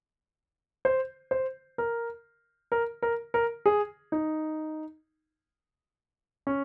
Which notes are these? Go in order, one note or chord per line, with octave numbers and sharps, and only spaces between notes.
C5
C5
A#4
A#4
A#4
A#4
G#4
D#4
C#4